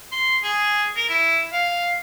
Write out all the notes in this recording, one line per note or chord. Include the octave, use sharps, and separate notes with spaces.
C6
G#4
A#4
E4
F5